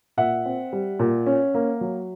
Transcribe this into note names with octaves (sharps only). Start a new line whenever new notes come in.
A#2 E5 F#5
C4
G3
A#2
C#4
A#3
F#3